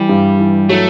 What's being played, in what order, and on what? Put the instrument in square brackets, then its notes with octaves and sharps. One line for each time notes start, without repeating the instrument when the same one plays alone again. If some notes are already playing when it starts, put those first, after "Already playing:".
Already playing: [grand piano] E3 [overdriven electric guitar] G3
[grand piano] G2
E3
[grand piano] F#3 [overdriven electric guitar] A3